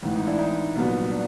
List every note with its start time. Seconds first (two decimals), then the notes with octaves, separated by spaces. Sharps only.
0.03 A1 G#2 E3
0.15 D#4
0.27 D4 E4
0.39 D#4
0.75 C2 A#2 F#3 B3
1.11 D4